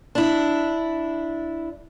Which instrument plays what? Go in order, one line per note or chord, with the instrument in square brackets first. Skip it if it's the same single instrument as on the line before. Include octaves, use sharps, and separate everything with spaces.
[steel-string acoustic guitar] D4 E4